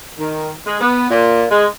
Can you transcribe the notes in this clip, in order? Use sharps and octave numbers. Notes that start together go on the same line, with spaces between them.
D#3
G#3
B3
A#2
G#3